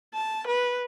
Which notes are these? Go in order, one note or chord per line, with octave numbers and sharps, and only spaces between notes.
A5
B4